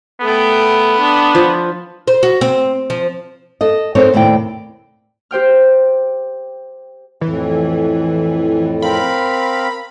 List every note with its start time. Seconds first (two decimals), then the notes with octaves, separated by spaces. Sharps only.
0.22 A3 B3 G5
0.99 D4
1.35 F3
2.08 C5
2.23 F#4
2.41 C4
2.90 F3
3.61 A4 D#5
3.95 C4 D#4 A4 A#4 C5 C#5
4.14 D#2 A2 C3 D5 G5
5.31 G4 C5 G5 F6
7.21 F2 A2 E3
8.82 C4 A#4 F5 B5